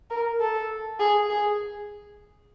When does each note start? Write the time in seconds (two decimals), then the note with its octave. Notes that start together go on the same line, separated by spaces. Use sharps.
0.10 A#4
0.40 A4
1.00 G#4
1.30 G#4